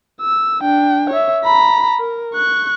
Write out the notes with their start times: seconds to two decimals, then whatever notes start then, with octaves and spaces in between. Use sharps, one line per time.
0.21 E6
0.62 D4 G5
1.10 C#5 E5
1.44 A#5 B5
1.99 A#4
2.34 C#6 F#6